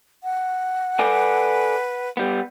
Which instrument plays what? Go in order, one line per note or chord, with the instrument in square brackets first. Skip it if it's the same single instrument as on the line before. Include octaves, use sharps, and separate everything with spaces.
[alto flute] F#5
[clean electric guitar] A4 D5 G#5 [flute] B4
[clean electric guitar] G3 B3